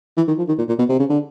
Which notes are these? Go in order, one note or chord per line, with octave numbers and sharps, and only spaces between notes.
E3
D#3
F3
D#3
A#2
A#2
B2
C3
C#3
D3